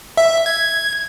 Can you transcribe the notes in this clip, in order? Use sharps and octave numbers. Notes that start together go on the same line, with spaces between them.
E5
G#6